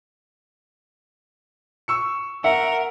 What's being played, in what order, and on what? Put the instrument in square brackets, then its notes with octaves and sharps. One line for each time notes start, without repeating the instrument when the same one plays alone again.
[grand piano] C#6 E6 C#7
[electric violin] A#4 [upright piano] E5 [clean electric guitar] F#5